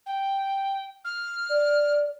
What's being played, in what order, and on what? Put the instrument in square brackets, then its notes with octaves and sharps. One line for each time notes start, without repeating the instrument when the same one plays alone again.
[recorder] G5
F6
[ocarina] D5